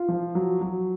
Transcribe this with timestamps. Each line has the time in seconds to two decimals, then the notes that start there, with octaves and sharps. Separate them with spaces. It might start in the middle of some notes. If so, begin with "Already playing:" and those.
Already playing: F4
0.08 F3
0.35 F#3
0.61 F#3